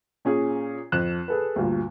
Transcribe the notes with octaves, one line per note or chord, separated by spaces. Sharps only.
A#2 C#4 G#4
F2 F#6 E7
G#4 A4 B4
D2 G2 A#2